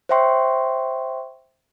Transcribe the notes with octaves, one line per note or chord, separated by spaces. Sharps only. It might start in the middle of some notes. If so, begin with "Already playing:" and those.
C5 C#5 E5 G5 C6 C#6